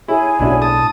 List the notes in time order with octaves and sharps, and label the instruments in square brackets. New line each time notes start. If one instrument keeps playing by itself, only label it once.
[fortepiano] E4 [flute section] G#4 C#5 G#5
[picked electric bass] B1 A2 [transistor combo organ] C#4 [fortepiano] D4 E4 F#4
[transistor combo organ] A5 D#6